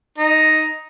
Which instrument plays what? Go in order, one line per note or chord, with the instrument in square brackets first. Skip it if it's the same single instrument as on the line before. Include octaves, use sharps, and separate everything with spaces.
[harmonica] D#4